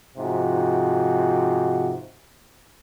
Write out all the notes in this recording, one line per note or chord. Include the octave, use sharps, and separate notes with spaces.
G#2 C3 F3 F#4